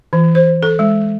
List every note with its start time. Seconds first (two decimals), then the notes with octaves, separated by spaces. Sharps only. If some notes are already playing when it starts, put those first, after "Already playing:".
0.13 E3
0.35 C5
0.63 A4
0.79 G#3